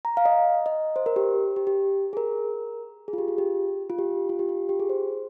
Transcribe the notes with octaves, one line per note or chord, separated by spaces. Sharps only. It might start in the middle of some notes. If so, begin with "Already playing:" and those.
A#5
F5
D#5
D#5
C5
A#4
G4
G4
G4
G#4
A#4
G#4
F4
G4
F4
G4
F4
G4
F4
G4
F4
G4
G#4
C5